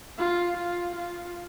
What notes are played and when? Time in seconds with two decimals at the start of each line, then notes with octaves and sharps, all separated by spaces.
0.18 F4
0.57 F4
0.96 F4